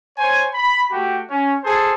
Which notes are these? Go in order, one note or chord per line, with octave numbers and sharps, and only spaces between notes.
C5 C#5 G#5
B5
A3 F#4 G4
C#4
G#4 A4 C5 A5